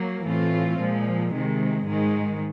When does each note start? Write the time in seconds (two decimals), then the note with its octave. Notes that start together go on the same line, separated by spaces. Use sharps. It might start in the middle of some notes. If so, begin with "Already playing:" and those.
Already playing: F#3 A#3
0.25 A2 E3 A3 C4 F4
0.79 A#2 F3 G#3
1.32 C3 D#3 G#3
1.86 G#2 D#3 G#3